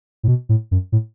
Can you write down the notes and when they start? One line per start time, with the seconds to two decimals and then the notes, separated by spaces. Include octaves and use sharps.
0.23 A2
0.28 B2
0.49 A2
0.71 F#2
0.92 A2